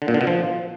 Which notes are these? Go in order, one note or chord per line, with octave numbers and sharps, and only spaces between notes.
D3
A#2
D3
B2
F3